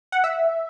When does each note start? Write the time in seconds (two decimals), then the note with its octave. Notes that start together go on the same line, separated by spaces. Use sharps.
0.12 F#5
0.24 E5